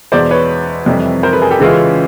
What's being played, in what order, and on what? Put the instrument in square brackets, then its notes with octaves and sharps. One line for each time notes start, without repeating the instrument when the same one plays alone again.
[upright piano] E2 B2 G#3 [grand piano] C5 D5
[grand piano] B4 C#5
[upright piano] F2 C3 E3 G3
[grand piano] A#4 C5
A4 B4
G#4 A#4
G4 A4
[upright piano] C#3 E3 G#3 C#4 F4